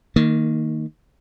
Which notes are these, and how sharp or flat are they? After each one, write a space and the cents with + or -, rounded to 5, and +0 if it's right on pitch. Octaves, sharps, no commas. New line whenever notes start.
D#3 +5 A#3 -25